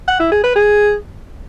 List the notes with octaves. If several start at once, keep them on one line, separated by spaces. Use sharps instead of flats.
F#5
E4
G#4
B4
G#4